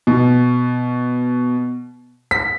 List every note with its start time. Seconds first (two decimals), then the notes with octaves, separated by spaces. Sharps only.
0.07 B2
2.31 B6